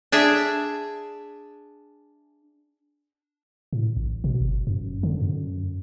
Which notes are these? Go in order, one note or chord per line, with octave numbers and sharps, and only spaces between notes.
D4 G#4 E5
A2
A1
B2
G1
F#2
D3
F#2